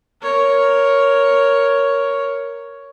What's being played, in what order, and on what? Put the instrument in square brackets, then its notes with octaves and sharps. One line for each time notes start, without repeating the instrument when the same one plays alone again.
[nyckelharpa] A#4 C#5